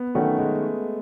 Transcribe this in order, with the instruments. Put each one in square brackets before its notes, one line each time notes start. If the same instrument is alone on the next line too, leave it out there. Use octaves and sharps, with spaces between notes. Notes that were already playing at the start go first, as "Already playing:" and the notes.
Already playing: [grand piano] B3
[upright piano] D#3 F#3 C#4 F#4 [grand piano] A3
[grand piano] G#3